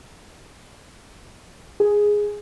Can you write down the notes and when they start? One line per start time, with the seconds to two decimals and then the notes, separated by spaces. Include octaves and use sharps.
1.80 G#4